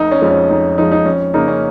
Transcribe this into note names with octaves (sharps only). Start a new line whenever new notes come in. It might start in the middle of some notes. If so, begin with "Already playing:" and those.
Already playing: F1 D#4
C#4
F2 F3 G#3
C#4
F1 D#4
F2 F3 G#3 D#4
D#4
F2 C#4
C#3 A#3 D#4
C#4